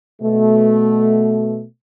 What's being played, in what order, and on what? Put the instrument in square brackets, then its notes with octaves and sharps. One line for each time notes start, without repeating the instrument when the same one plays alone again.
[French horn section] B2 A3